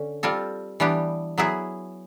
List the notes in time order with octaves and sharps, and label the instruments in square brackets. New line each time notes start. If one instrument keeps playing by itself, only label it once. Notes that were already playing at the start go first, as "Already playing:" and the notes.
Already playing: [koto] D3 C#4
G3 C4 F4 A4
E3 G3 B3 D4 G4
F#3 B3 E4 G#4